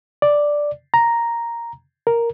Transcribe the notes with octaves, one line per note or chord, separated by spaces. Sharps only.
D5
A#5
A#4